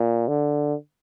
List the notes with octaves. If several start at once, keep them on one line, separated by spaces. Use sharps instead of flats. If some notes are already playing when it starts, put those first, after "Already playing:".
Already playing: A#2
D3